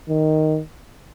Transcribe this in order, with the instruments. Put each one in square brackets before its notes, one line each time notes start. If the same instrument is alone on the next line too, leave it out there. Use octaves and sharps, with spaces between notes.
[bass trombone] D#3